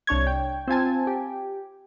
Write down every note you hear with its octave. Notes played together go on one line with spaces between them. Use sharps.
C2 D4 C#5 G#6
G5
C4 F4 G#5 A5
G4